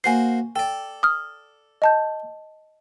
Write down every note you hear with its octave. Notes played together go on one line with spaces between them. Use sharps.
A#3 F#4 C5 G#5 C7
A4 D5 G5
D#6 F6
D#5 A5 G6